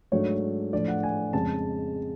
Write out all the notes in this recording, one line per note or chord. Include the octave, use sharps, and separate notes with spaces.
G#2 F#3 A3 D4 C#5
A2 F3 A3 D4 D5
F#5
G#5
F2 C#3 G#3 A5